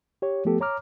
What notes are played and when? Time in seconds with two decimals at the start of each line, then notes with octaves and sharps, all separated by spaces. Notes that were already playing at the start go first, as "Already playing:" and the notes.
0.22 G4 C#5
0.45 F3 A3 B3 G4 A4
0.61 C#5 A#5 D6 F6